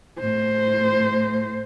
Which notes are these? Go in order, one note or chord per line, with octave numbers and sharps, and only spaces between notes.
A2 C5